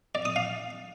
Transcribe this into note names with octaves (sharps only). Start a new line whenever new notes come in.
D5
D#6
F5